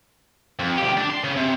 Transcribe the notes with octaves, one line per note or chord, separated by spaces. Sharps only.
F2
D2 G4
D4
C6
C#3
C3